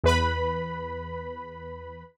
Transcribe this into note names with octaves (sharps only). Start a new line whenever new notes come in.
E2 B4 B5